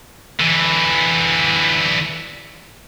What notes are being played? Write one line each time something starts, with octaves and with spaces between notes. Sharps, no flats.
D3 E3